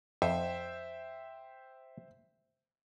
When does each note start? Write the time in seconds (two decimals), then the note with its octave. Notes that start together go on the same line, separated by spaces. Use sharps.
0.22 F2 C5 E5 G5